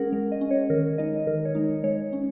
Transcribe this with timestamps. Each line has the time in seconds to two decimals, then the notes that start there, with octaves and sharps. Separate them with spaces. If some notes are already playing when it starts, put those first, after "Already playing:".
Already playing: G#3 C#4 G#4 A#4 F#5
0.12 G#3
0.32 D#5
0.41 C#4
0.51 C#5
0.70 D#3 A#4
0.98 G#3 D#4 D#5
1.27 D#3 A#4
1.45 C#5
1.55 G#3 D#4
1.84 G#3 C#5
2.13 C#4